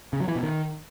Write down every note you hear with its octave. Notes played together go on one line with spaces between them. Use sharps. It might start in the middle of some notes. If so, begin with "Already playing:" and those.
C#3
F#3
E3
B2
D#3